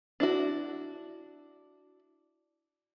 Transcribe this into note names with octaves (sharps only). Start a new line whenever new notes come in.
D4 E4 F#4